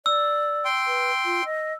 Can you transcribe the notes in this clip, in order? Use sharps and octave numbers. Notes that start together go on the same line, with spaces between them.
D5 E6
G5 C6
B4
F4
D#5